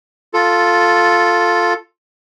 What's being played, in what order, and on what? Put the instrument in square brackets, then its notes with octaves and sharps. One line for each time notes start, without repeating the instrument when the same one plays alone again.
[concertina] F4 A4